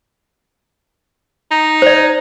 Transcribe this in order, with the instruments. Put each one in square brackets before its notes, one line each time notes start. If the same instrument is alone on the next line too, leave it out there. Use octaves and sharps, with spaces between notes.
[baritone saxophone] D#4
[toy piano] C5 D5